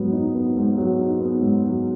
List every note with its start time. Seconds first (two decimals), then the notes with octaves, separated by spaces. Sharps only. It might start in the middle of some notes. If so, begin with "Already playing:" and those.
Already playing: G#2 F#3 B3
0.13 D#4
0.35 B3
0.56 G#2
0.78 F#3
0.99 D#4
1.20 B3
1.42 G#2
1.64 F#3